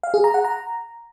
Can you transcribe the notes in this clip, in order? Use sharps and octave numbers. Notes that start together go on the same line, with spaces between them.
F5
G#4
A#5
F#5
A#5